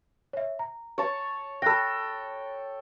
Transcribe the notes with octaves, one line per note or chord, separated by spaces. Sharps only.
C#5 E5
A#5
C#5 A5 C#6
A4 G5 B5 F#6 A#6